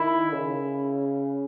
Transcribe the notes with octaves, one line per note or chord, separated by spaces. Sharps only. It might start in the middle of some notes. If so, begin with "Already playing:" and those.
Already playing: D#3 E4
C#3